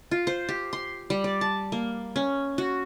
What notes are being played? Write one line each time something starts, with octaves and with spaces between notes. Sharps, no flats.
F4
C5
G4
C6
G3
D5
A5
A#3
C#4
F#4